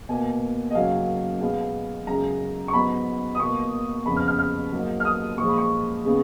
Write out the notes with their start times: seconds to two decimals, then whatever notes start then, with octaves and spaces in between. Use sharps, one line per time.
0.09 B2 A#3 G#5
0.70 D#5
0.75 F#2 C#3 F#3 A#3 F5
1.41 B2 G#3 B3 F5
2.07 F#2 C#3 G#3 A#5
2.68 C#6
2.73 G#2 F#3 B3 B5
3.35 D#6
3.39 B2 A#3 C#6
4.06 F2 C#3 F3 B3 B5
4.16 F6
4.27 F6
4.39 F6
4.72 G#2 F#3 A#3
5.00 F6
5.05 D#6
5.38 A#2 F3 G#3 C#6
5.48 B5
5.58 C#6
6.05 C#3 G#3 B3